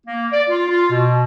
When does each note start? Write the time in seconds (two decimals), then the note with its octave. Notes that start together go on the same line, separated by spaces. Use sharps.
0.07 A#3
0.33 D5
0.49 F4
0.70 F4
0.91 B2